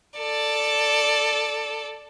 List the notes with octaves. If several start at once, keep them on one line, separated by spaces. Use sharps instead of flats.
A4 D5